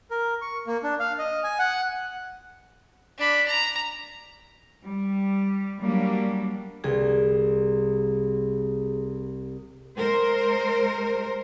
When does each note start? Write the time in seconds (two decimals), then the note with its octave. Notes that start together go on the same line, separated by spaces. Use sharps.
0.11 A#4
0.42 C#6
0.67 A#3
0.83 D4
1.00 F5
1.19 D#5
1.44 G#5
1.59 F#5
3.18 D4 B5
3.48 A#5
4.85 G3
5.82 F#3 G3 A#3 D4
6.84 C2 G#4
9.98 G#3 A#4 C5